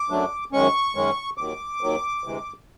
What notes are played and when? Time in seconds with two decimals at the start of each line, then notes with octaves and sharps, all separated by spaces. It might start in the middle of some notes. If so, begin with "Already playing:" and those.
Already playing: D6
0.10 F#2 D3 F#3 A3 D4
0.52 F#2 D#3 G#3 C#4 C#6
0.95 F#2 D#3 G#3 C#4
1.37 D#2 D#3 F#3 D6
1.81 D#2 D#3 F#3
2.24 D2 C3 E3 G#3